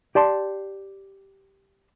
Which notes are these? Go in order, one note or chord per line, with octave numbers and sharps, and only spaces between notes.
G4 D5 A5 C6